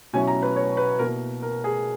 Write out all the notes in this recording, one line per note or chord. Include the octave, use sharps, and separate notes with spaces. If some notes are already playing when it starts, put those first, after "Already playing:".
B2 F#3 C#4 E4 G#5
A#5
B4
C#5
B4
B2 A#3 E4 A#4
A#4
G#4